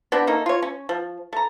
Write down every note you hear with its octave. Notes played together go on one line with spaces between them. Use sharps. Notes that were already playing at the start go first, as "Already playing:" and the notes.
B3 C4 D4 G4
A3 A#3 D#4
F4 C#5
C#4
F3
A3 A#5